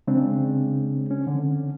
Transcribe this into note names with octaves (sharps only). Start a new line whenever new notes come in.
C#3 G#3 C4 D4
C#4
D3